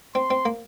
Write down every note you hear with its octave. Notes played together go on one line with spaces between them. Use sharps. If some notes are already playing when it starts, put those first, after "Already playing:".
C4 C6
C4
A#3